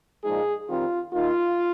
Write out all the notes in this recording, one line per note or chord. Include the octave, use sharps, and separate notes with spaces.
A#2 F3 G#3 D#4 G#4
D#3 G3 C4 D#4 F4
D#3 A#3 D#4 F4